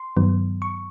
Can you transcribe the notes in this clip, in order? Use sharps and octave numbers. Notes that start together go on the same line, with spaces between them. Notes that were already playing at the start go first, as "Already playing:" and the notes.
Already playing: C6
G2 D#3 F#3 B3
C#6